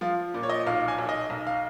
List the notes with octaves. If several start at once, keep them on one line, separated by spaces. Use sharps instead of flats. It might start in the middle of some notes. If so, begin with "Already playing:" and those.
F3 F4
A#2
C#5
D#5
B1 F5
G#5
B1
D#5
B1
F5